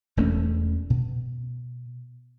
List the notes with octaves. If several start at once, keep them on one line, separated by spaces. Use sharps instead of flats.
E1 E2 A3 C#4
B2